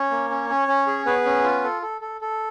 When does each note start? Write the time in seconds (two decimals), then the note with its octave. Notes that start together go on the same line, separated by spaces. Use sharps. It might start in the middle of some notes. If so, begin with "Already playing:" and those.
Already playing: C#4 C#5
0.11 A#3
0.30 C#4
0.49 C#4
0.68 C#4
0.87 G#4
1.06 B3 G#4 B4
1.25 C#4
1.44 F4
1.63 A4
1.82 A4
2.01 A4
2.21 A4